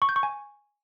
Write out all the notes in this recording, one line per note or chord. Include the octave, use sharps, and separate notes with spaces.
C#6
G6
C#6
G#5